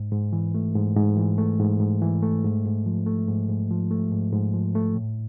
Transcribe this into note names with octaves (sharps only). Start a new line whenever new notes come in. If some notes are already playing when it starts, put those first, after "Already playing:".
Already playing: G#2
G#2
E3
A3
G#2
G#2
E3
A3
G#2
G#2
E3
A3
G#2
G#2
F3
A3
G#2
G#2
F3
A3
G#2
G#2
F3
A3
A2